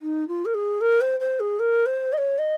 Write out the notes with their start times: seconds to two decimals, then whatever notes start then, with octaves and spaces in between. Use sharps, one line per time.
0.02 D#4
0.28 F4
0.45 A#4
0.54 G#4
0.81 A#4
1.01 C5
1.20 C5
1.39 G#4
1.59 A#4
1.86 C5
2.12 D#5
2.17 C#5
2.38 D#5